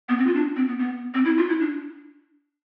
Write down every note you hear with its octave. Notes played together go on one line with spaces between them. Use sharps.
B3
C4
F4
D4
C4
B3
B3
C4
E4
F4
E4
D4